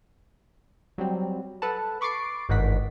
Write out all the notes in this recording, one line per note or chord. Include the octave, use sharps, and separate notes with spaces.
F#3 G3 C4
A4 B4 F#5 A5
B5 C#6 D6 A6 C7 D7
G1 G#2 D#3 D#4 F#5 B6